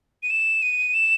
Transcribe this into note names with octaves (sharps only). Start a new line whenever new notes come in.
D#7
E7
D#7
E7